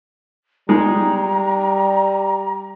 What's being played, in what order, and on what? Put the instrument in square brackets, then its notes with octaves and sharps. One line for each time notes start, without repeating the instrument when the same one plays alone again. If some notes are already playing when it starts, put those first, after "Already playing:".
[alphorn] G3 [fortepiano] G#3 D#4 G#4 [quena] A#5